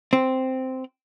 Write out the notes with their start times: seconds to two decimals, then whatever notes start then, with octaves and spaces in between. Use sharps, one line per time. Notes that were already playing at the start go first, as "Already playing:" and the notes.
0.13 C4